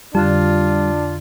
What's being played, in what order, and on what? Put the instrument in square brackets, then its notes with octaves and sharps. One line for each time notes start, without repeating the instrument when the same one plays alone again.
[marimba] F2 D3 [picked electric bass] G3 [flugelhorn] D4 [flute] F4